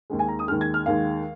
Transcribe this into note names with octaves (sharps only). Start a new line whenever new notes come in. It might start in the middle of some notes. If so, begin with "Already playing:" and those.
D#2 D#3 G#3
G#5
A#5
D#6
D#2 D#3 G#3 F6
G#6
F6
D#2 D#3 G#3 F5